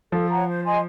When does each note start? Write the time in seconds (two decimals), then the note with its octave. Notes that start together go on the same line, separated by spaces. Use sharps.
0.12 F3 A4
0.30 C#5 F#5 A#5
0.48 C5
0.65 D#5 G#5 C6